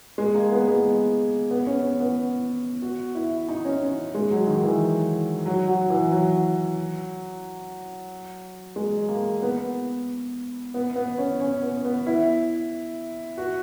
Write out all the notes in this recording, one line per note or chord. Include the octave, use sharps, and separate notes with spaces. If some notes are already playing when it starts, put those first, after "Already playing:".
G#3
A#3
B3
G#3
B3
C#4
C#4
B3
F#4
E4
D#4
C#4
C#4
G#3
F#3
D#3
E3
F#3
F#3
E3
F#3
G#3
A#3
B3
B3
B3
C#4
C#4
B3
B3
E4
F#4